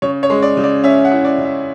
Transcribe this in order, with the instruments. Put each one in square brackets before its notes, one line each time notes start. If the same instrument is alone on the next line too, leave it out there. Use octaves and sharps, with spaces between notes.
[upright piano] C#3 C#5
C#5
G#3
D5
C#3
D5
C#4 E5
F#5
E4
D5
C#3
E5